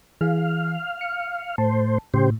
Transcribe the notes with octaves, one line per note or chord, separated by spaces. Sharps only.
E3 G#4 F5
C#7
A2 C5 A5
A2 C#3 G4 C5